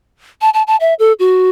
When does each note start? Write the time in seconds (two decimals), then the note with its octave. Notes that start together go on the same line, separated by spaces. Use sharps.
0.41 A5
0.54 A5
0.67 A5
0.80 E5
0.99 A4
1.19 F#4